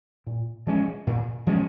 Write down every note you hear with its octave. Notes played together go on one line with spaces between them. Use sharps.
A#2
F3 G#3 C#4
A#2
F3 G#3 C#4